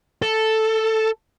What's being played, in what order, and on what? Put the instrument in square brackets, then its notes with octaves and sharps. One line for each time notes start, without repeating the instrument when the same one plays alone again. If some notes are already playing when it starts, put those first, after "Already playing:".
[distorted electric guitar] A4